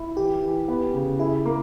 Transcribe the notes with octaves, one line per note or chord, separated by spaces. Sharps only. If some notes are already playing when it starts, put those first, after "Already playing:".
Already playing: E4
E3 G4
E3
B3
C#3
E4 G#4
A#3